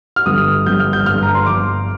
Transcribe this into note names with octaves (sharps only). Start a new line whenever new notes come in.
F6
G1 G2 D3 G3 D#6
G1 G2 D3 G3 G6
F6
G6
G1 G2 D3 G3 F6
A#5
C6
G1 G2 D3 G3 D6